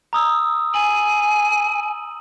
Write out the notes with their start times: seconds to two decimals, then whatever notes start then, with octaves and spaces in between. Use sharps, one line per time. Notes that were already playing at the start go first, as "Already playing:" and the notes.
0.13 A#5 D#6 E6
0.74 G#5 F#7